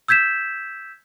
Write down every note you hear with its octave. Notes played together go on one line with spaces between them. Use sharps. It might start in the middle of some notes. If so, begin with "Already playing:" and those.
E6 G6 G#6 B6 E7